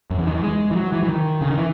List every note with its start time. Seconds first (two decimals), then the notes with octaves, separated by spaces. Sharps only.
0.11 F#2
0.18 E2
0.27 D#3
0.35 E3
0.43 G#3
0.71 E3
0.76 F#3
0.92 E3
1.03 E3
1.09 D#3
1.41 C#3
1.50 D#3
1.58 E3